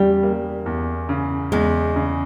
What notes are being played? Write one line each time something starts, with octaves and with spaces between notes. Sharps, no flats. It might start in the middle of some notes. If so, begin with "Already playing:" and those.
Already playing: E2 C#3 G3
A#3
E2
C#3
E2 G#3
C#3